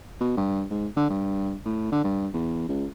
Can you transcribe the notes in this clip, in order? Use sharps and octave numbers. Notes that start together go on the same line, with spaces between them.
B2
G2
G#2
D3
G2
A2
D3
G2
E2
C#2